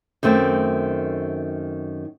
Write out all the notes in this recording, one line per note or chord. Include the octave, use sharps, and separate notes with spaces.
F#2 D#3 A3 C4